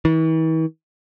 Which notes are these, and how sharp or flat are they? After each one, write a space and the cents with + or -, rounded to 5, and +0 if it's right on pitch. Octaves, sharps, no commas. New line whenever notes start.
E3 -45